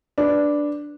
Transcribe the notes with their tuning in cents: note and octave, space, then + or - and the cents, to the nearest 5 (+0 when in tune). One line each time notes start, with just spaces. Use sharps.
D4 +0 B4 +0